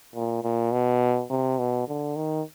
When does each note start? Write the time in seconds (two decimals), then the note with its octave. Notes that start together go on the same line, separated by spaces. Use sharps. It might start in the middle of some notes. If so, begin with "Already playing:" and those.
0.15 A#2
0.43 A#2
0.72 B2
1.30 C3
1.59 B2
1.88 D3
2.16 D#3